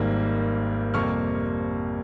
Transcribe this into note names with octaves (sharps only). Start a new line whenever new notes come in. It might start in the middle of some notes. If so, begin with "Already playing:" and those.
Already playing: G#1 G#2 D#3 G3 A#3
F2 C3 G3 A#3 C#6 F6